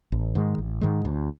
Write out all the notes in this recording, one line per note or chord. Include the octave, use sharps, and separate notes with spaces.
A1
G#2 D#3 G#3
A1
G#2 D#3 G#3
D2